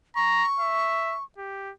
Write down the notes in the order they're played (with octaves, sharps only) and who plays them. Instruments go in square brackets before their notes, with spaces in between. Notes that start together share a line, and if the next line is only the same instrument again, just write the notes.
[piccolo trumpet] A#5 [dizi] C#6
[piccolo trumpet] E5
G4